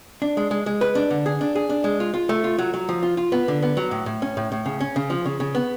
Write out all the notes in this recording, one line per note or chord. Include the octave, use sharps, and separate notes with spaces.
D4
G#3
G#3
G#3
B4
D4
D3
G#4
D4
G#4
D4
G#3
F4
F4
A3
F4
F#3
F#3
F3
F4
F4
B3
D3
B3
F#3
A2
A2
C#4
A2
A2
C#3
C#4
C#3
F3
C#3
C#3
B3